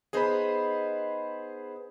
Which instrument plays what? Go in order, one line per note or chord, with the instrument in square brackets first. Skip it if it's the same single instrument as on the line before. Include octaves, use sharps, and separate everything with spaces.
[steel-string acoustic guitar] B3 D#4 D#5 [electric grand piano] G#4 C5 B5